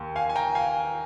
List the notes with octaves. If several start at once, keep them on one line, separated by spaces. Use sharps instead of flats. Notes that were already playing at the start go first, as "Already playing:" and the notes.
Already playing: D#2
F5 G#5
G#5
G5 A#5
F5 G#5